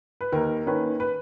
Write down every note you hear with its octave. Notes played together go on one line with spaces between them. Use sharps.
B4
D#2 A#4
D#3 A#3 C#4 B4
B4